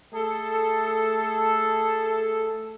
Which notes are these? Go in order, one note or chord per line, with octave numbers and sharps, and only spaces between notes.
A3 G#4 A4